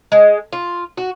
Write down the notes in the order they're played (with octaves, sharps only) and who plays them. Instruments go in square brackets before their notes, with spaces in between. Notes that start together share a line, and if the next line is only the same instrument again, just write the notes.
[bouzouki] G#3
F4
F#4